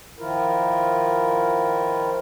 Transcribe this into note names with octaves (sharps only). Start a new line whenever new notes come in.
D#3 F3 E4 F4 A#4